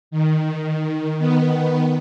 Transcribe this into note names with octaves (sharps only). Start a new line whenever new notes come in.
D#3
D#3 B3